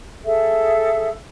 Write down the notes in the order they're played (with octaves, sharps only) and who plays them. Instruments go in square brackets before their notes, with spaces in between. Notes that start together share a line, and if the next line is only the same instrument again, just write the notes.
[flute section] G#4 A4 E5